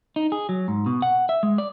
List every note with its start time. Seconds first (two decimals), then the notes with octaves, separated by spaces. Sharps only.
0.16 D#4
0.32 G#4
0.49 F#3
0.68 G#2
0.86 B2
1.02 F#5
1.29 E5
1.43 G#3
1.58 D5